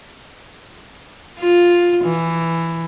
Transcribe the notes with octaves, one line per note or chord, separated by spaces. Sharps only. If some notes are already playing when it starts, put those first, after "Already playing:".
F4
E3